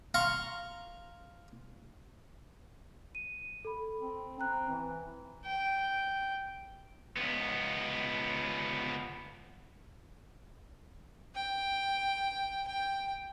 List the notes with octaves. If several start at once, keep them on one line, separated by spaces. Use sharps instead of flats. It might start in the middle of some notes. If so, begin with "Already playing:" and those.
F5 A#5 C6 C#6
D#7
A4 B5
C4
C4 A#5 F#6
E3
G5
C#2 B3
G5
G5